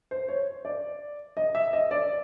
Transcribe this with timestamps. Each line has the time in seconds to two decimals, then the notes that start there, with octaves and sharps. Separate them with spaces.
0.11 C5
0.28 C#5
0.65 D5
1.37 D#5
1.55 E5
1.73 D#5
1.91 D5